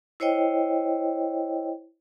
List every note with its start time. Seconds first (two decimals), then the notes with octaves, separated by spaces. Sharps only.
0.20 E4 C5 C#5 D#5 G5